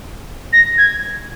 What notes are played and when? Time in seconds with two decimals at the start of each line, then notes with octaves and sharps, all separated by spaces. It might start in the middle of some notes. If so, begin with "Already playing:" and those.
0.53 A#6
0.78 G#6